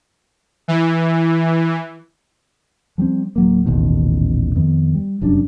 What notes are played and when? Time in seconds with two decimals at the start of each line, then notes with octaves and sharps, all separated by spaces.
0.68 E3
2.98 F3 G3 B3 C4
3.36 D1 F#3 A#3
3.66 D#1 A1 B2 D#3
4.55 F2 D#3 B3
4.95 G3
5.21 F1 F#2 G3 D4